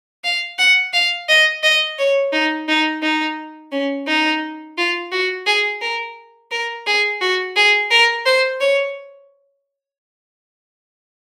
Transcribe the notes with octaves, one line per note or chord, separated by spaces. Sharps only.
F5
F#5
F5
D#5
D#5
C#5
D#4
D#4
D#4
C#4
D#4
F4
F#4
G#4
A#4
A#4
G#4
F#4
G#4
A#4
C5
C#5